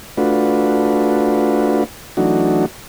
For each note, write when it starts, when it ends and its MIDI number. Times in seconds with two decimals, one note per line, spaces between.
0.17 1.84 57
0.17 1.84 62
0.17 1.84 65
0.17 1.84 66
0.17 1.84 71
2.17 2.66 52
2.17 2.66 54
2.17 2.66 57
2.17 2.66 62
2.17 2.66 63
2.17 2.66 66